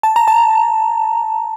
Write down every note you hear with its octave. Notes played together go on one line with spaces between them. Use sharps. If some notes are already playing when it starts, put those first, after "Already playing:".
A5
A#5
A5